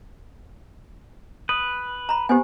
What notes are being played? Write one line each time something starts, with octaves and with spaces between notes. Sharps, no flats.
B4 D#6
A#5 B5
B3 G4 C5 G#5